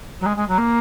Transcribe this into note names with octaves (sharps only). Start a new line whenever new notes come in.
F#3
G#3
G#3
F#3
A#3